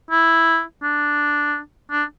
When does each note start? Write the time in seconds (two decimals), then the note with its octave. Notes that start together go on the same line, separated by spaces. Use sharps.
0.11 E4
0.83 D4
1.91 D4